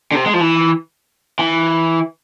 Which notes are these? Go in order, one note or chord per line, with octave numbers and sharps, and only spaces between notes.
D3
C3
G#3
F3
E3
E3